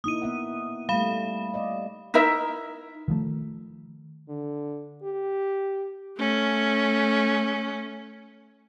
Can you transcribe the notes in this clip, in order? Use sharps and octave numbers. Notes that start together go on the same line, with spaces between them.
A#3 D#4 E4 D#6 D#7
B3 E5 F#5
G3 A3 F5 B5 E7
D5 D#5
D#4 E4 A#4 E5
D#3 F3 A3
D3
G4
A3 C#4